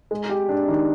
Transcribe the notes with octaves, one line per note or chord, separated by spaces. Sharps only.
G#3
G4
D4
D#3